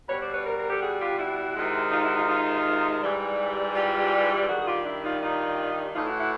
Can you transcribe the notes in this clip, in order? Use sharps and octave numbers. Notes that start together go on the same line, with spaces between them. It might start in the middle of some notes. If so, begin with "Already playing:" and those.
B2 G3 B4 C#5
C5 D5
B4 C#5
A#4 C5
A#4 C5
G4 A4
F#4 G#4
F4 G4
E4 F#4
C3 D#3 G#3
D#4 F4
E4 F#4
D#4 F4
D#4 F4
G#2 E3 G3
F4 G4
G2 D#3 G3 F#4 G#4
G#4
F4 G4
D4 E4
D#4 F4
D#4 F4
A2 E3 A3 D#4 F4
E4 F#4
E4 F#4